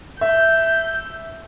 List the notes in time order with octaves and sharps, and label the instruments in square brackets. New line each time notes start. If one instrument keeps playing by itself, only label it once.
[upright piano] E5 [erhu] G6